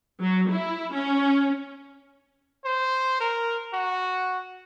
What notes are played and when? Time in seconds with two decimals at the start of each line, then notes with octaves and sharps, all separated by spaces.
0.21 F#3
0.50 E4
0.95 C#4
2.65 C5
3.20 A#4
3.74 F#4